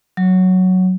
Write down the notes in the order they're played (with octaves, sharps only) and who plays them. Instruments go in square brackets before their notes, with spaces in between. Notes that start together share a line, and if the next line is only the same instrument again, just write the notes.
[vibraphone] F#3